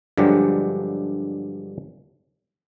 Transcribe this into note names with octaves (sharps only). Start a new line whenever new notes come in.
G2 D3 F3 F#3 G#3 G4